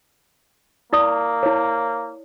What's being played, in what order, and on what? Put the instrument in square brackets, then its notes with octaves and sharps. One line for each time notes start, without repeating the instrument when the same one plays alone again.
[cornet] A#3 [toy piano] E4 D5 D#6
[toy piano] E4 C#5